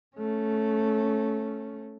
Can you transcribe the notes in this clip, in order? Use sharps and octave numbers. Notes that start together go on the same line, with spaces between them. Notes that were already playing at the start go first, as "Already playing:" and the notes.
A3 C#4